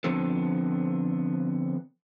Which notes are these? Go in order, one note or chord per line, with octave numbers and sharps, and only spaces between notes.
D3 F3 B3 C4 A4